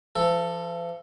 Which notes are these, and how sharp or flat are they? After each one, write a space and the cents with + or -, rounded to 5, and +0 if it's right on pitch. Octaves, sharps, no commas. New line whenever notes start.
F3 -45 A4 +5